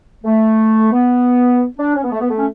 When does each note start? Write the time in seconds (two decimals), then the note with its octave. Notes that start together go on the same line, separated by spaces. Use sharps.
0.25 A3
0.92 B3
1.78 D4
1.95 C#4
2.04 B3
2.12 A3
2.20 B3
2.29 A3
2.38 C#4